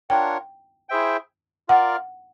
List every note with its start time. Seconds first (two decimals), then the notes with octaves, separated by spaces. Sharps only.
0.10 D4 F4 A#4 C#5 F#5 G5
0.89 E4 G#4 C5 E5 G5
1.68 F4 A#4 D5 F5 F#5